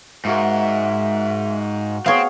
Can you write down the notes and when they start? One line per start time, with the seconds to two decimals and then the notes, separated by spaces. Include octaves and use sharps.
0.25 G#2 A#3 F#4 A#4 E5
2.06 B3 C4 G#4 C#5 F5